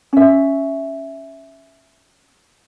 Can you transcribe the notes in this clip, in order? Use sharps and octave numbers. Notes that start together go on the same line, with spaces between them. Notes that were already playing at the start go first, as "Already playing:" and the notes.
C#4 E5